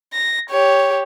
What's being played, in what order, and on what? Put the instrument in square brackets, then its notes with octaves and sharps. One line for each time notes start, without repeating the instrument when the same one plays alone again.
[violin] A#6
G4 C#5